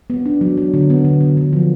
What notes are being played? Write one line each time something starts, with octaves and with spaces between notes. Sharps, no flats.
B3
D4
F#3
F#3
D3
B3
D3
D3
D3
F3